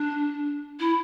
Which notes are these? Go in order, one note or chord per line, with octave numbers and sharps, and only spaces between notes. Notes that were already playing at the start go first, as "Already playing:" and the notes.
Already playing: D4
E4